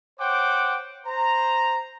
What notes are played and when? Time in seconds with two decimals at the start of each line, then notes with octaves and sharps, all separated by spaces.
0.19 C5 C#5 F#5 G5 D6
1.06 C5 A#5